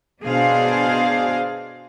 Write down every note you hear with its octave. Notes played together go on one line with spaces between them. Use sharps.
B2 D4 G#4 C5 F5